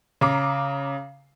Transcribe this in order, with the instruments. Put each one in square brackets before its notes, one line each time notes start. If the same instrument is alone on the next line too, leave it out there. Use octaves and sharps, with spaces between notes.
[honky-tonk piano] C#3 A#5 D6 C7